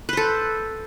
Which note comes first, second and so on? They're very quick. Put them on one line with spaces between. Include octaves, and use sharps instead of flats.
B4 C5 A4